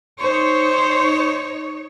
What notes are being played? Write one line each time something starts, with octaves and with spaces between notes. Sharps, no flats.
D#4 C5 C#5